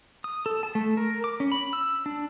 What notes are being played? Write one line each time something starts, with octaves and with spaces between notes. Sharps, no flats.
D#6
A4
A5
A3
A#4
D6
C#4
B5
E6
D4